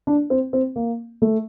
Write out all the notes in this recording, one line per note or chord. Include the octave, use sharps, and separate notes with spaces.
D4
C4
C4
A#3
A3